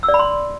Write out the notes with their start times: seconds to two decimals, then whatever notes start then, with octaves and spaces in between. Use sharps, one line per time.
0.03 E6
0.08 D5
0.14 B5
0.19 C6